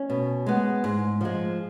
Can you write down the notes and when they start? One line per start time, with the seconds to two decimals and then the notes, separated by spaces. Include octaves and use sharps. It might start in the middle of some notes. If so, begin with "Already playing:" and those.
Already playing: C#4
0.10 B2
0.46 G#3 B3
0.84 G#2
1.21 F3 G#3